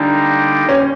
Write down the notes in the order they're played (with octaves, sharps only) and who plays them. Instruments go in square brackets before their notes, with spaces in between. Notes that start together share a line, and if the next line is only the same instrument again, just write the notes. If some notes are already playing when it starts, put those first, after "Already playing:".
Already playing: [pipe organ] D3 G3 A#3 D#4 G4 [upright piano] D4
[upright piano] C#4